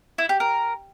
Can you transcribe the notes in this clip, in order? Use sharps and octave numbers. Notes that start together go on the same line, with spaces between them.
E4
G4
A#4